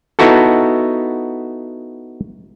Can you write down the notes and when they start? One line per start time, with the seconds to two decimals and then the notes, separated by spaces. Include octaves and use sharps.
0.19 B3 D#4 E4 F#4 A4